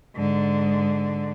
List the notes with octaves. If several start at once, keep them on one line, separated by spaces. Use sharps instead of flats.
G#2 D3